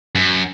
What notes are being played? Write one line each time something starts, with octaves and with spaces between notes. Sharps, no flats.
F#2